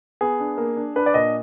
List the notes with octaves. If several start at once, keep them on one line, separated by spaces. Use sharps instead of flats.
B3 G#4
D4
A#3
D4
D4 B4
D5
A#2 D#5